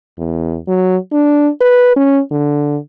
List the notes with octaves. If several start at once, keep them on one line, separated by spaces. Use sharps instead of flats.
E2
F#3
D4
B4
C#4
D3